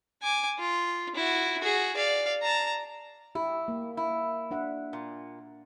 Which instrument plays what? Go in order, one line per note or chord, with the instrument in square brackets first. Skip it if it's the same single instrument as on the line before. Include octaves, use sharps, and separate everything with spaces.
[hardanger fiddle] G#5 D6
F4
E4 F#4
F#4 G#4
D5 F5
A5 A#5
[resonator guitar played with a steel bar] E4 [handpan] G4
[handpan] A#3
[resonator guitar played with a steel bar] E4
[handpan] D4 E5 F#5
[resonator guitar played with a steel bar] A#2